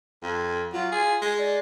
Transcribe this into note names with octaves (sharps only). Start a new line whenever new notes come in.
F2
F#3 F4
G#4
G#3
D5